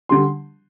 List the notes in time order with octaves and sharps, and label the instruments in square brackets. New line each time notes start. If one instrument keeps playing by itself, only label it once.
[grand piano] D3 G3 C6